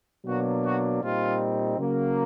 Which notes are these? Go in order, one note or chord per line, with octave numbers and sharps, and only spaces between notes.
B2 F#3 A#3 D4 F#4
F#4
A#2 G3 C4 D#4 F4
C#3 F#3 A#3